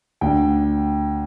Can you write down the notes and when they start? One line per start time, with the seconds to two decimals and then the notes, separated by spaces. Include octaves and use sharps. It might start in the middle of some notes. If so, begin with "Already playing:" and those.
0.21 D2 D3 G5